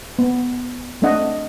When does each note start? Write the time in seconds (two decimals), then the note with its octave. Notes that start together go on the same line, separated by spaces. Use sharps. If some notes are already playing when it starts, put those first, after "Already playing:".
0.19 B3
1.02 A3 C4 D4 D#5 F#5